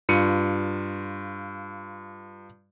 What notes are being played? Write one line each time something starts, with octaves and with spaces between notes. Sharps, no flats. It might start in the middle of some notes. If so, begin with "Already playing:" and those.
G2 F4 C#7 D#7